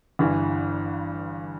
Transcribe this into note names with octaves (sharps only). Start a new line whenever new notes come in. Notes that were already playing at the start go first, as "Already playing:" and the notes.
G1 G2 E3